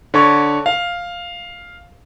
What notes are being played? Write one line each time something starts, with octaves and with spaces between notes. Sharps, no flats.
D3 C#5 A5 C#6
F5